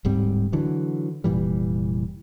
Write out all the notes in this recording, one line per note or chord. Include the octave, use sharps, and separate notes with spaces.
D1 G#2 G3 C4
D3 E3 F#3
F1 A#2 E3 G3